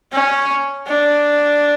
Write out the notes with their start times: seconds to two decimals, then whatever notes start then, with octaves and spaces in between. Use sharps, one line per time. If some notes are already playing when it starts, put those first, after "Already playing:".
0.13 C#4
0.87 D4